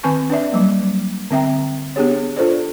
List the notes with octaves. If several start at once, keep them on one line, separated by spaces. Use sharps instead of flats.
D#3 C4 B4 G#5 A5 C#6
D4 B4 D5 E5
F#3 G3 A#3
D3 C4 E5 G5 A#5
B3 D4 G4 G#4 C#5
D4 F4 A4 C5 D5